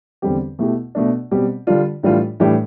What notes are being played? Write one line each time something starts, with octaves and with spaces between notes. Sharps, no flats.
E2 D3 G3 C4 G4
B2 A3 E4 G4
B2 A3 D4
B2 G3 C4 G4
D3 G3 D4 F4
A2 E3 G3 D4 F4
A2 E3 G3 D4 G4